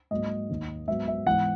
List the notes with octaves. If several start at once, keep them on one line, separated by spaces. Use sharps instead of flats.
G#2 F#3 A#3 D#5
D#2 D#3 A#3
G#2 F#3 B3 E5
E5
G#2 E3 B3 F#5